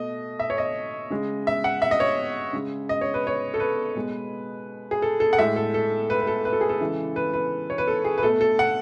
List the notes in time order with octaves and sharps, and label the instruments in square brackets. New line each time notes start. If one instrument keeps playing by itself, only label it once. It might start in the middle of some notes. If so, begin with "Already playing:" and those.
Already playing: [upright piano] B2 A3 D#5
E5
C#5
D#5
C#3 G#3
E5
F#5
E5
D#5
C#5
C#3 G#3
D#5
C#5
B4
C#5
A4
B4
B2 G#3
G#4
A4
A4
F#5
A2 G#3 E5
A4
A4
B4
B4
A4
B4
A4
G#4
A4
C#3 E3 G#3
B4
B4
C#5
B4
A4
G#4
B4
B2 A3 A4
A4
F#5